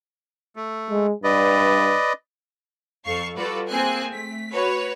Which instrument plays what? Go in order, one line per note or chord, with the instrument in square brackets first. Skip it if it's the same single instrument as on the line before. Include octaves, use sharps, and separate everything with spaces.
[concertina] A3
[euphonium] G#3
[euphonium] G2 [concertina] B4 D5 D#5
[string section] F2 A4 F5 C#6 C7
G3 F4 F#4 A4 B4 D5
A#3 C4 G#4 G#5 F#6
A3 B6
F#4 B4 C#5